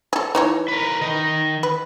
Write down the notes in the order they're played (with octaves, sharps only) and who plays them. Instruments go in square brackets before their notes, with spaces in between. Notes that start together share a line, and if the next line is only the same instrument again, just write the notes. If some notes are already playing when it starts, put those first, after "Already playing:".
[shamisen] G#4 A4
E3 D#4 C#5
[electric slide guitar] A#4 B4
D#3 D#5
[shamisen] B4